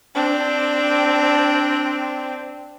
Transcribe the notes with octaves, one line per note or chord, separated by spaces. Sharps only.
C4 D4